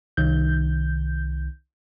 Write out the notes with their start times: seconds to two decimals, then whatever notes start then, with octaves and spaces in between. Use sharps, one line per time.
0.17 C2 D#3 G6